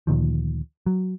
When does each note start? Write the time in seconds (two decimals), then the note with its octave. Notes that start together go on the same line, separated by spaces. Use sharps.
0.07 D2 A#2 D#3 F3
0.86 F#3